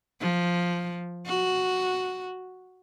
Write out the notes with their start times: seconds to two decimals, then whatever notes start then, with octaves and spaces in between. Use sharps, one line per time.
0.20 F3
1.26 F#4